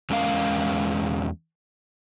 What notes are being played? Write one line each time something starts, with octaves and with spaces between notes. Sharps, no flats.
E2 G#3 C#4 A#4 F5